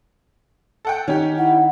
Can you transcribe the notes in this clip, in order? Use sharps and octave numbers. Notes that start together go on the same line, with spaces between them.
A4 F#5 G5
D#3 C#4 G4
E4 F#5